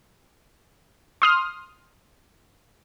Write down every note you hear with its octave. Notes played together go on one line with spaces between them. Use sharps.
C6 D#6 F6